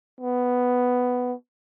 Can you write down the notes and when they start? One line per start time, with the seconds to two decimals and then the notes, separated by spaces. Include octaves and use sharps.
0.20 B3